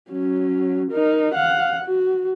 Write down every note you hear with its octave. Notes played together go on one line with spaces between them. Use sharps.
F#3 C#4
D#4 A#4
F5 F#5
F#4